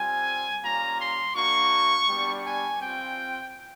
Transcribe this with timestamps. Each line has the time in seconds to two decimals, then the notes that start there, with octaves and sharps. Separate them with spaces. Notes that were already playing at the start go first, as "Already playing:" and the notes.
Already playing: G3 C4 F4 G#5
0.64 G3 A#3 C#4 F4 A#5
1.01 C6
1.36 A#3 D4 F#4 C#6
2.09 G3 B3 D4
2.45 G#5
2.81 C4 F4 G5